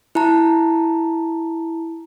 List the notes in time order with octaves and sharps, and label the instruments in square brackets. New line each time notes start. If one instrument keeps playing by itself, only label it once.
[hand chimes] E4 A5 A#5